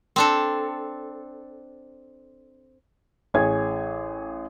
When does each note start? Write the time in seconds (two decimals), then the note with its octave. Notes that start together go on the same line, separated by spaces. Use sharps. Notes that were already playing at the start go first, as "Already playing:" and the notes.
0.16 C4 D4 A4
3.34 A1 G#4 C#5 G#6